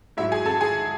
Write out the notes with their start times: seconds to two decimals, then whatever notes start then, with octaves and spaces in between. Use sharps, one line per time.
0.17 G#2 F#3 E4 E5
0.32 G#4 G#5
0.46 A4 A5
0.61 G#4 G#5